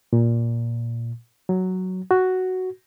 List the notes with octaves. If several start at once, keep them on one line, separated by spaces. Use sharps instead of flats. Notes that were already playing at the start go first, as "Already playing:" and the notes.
A#2
F#3
F#4